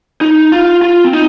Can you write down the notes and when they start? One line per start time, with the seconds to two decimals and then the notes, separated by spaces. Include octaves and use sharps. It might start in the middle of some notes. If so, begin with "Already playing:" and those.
0.21 D#4
0.52 F4
0.82 F4
1.04 C4
1.13 D#4